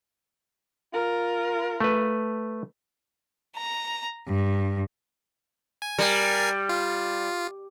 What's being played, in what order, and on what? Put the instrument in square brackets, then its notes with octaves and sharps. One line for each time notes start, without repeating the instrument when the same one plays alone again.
[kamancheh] F4 A#4
[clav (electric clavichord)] A3 B4
[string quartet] A#5
G2
[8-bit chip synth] G#5
[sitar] G3 [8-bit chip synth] A#4 G#5 C7
[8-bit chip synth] F4